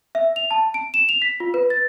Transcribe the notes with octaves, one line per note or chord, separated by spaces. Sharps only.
E5
F7
A5
D7
E7
F7
B6
F4
B4
A6